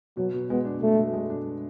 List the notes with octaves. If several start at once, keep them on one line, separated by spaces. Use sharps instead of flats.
B2 F#3
B2
G#3 B3
D4
B2 A3
B2
G#3
D4